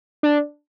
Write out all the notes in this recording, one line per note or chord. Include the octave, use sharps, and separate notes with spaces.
D4